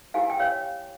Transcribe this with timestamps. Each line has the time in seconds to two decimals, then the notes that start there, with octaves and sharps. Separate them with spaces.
0.14 E4 G4 C5 F5 G#5
0.30 G5
0.39 C#5 F5